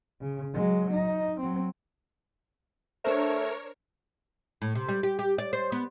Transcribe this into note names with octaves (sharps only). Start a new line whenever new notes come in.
C#3
F#3 G#3
D#4
F#3 C4
A3 D4 A#4 C5 C#5
A2
C3
G3
G4
G4
D5
C5
B3